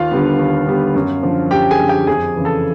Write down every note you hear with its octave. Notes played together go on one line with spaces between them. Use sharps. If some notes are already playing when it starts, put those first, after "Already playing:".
Already playing: D#2 F4 F5
D3 G3 B3
D#2
D3 G3 B3
F#2
D3 F3
F#2 G4 G5
G#4 G#5
D3 F3
G4 G5
F2 G#4 G#5
C#3 E3
A4 A5